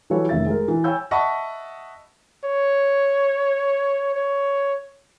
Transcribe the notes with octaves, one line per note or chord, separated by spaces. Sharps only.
E3 F#3 G3 A4 B4 C#5
F1 D#3 E5 A6
G#3 A#4
E3
C#5 G5 G#5 B5 E6 G6
D#5 E5 F#5 A5 B5 C#6
C#5
C#5